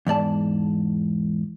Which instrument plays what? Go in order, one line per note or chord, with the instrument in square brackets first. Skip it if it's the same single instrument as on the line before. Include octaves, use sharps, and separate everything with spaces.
[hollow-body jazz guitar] E2 G#2 D5 A5